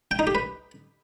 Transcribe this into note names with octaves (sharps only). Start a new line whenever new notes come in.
G5
D#4
G4
B4